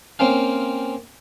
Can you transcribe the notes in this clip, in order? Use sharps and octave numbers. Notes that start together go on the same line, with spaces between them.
A#3 C4 C#4 F5